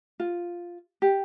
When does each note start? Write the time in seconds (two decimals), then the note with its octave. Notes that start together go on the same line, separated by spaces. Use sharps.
0.20 F4
1.02 G4